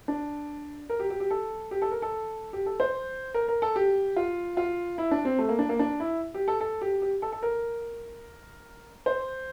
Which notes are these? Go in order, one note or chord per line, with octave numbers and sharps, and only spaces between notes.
D4
A#4
G4
G4
G4
A4
G4
A4
A#4
A4
G4
A4
C5
A#4
A#4
A4
G4
F4
F4
E4
D4
C4
A3
A#3
D4
A#3
D4
E4
G4
A4
A4
G4
G4
A4
A4
A#4
C5